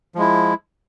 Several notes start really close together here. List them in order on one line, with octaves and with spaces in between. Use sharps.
F3 G#3 E4